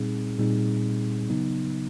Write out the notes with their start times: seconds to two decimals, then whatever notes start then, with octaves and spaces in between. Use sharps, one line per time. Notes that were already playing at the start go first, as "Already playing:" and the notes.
Already playing: A#2 G3 C4 D#4 G#4
0.39 A#2 G3 C4 D#4 G#4
1.29 C#3 F#3 B3 D#4